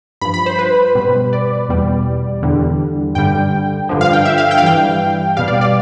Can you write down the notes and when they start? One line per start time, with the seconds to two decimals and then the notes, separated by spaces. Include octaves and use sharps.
0.21 G2 B5
0.25 F3
0.34 B5
0.46 C5
0.59 B4
0.95 B2 G3
1.33 D5
1.69 E2 B2 G3
2.43 E2 D3 G3
3.15 G2 D3 G3 G5
3.89 G2 D3 F3
4.01 F5
4.13 G5
4.25 E5
4.38 F5
4.51 G5
4.58 F5
4.62 G2 E3 G3 G5
5.37 B2 G3 F5
5.48 D5
5.61 D5